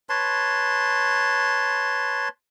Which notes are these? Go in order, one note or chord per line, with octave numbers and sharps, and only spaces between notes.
B4 C#5 A5 C6